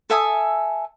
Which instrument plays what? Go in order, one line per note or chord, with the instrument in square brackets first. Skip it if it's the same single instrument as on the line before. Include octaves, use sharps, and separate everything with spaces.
[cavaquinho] A4 E5 G#5 D#6